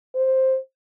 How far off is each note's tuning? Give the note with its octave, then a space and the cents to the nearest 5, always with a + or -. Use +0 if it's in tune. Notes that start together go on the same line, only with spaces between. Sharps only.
C5 +5